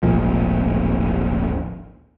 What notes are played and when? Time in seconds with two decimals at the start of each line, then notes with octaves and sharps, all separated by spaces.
0.03 D1 G#1 A#2 F3